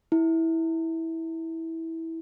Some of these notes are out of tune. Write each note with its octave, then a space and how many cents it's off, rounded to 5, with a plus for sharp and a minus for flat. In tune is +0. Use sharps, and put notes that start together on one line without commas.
E4 -15